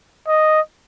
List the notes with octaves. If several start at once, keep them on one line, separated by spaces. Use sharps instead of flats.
D#5